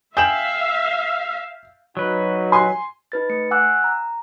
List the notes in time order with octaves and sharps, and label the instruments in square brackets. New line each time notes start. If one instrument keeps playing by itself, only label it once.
[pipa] G#4 G5 [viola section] E5 F5 [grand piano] G6 E7 F#7
[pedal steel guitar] F#3 B4 [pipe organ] D#4 F#4
[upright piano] G#5 C6
[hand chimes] D#4 B4 A6
A3 C#7
F#5 G#5 D6 E6 F#6
A#5